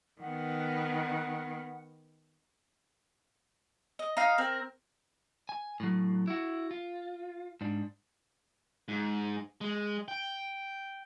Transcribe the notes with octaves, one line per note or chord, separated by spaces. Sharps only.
D#3 B3 F#5
D#5
D#4 F5
C4 A#4
G#5
A2 F#3
E4 F#4
F4
G#2 D4
G#2
G#3
G5